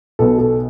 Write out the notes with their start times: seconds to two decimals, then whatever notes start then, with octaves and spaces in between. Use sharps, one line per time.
0.19 B1 B2 A4
0.38 A4